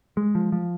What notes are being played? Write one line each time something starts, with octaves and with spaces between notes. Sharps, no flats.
G#3
F3
F3